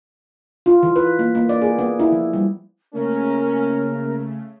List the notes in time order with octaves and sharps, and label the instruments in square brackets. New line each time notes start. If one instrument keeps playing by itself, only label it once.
[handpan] F4
E3
B4
A#3
A#3
D5
G#4
B3
E4
F3
G3
[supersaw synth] C#3 A3 [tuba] A#3 [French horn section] C#4 [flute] A#4